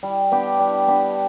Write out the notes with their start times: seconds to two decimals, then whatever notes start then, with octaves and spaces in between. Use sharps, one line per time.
0.03 G3
0.32 B3 D4 G4
0.60 G3
0.88 B3 D4 G4